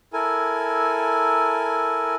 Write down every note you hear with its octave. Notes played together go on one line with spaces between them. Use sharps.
E4 A4 A#4 G#5